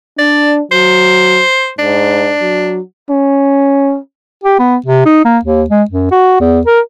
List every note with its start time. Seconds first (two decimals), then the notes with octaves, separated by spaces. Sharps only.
0.18 D4 D5
0.71 F#3 C5
1.79 G#2 D4
2.41 F#3
3.10 C#4
4.44 G4
4.59 B3
4.86 C3
5.06 D#4
5.25 A#3
5.45 D#2
5.70 G#3
5.90 F#2
6.11 F#4
6.40 E2
6.66 A#4